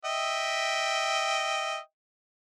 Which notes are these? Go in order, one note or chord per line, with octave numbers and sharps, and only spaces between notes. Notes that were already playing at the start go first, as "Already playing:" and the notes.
D#5 E5 G5